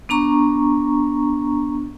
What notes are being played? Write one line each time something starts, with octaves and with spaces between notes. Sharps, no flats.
B3 D4 A#5 C#6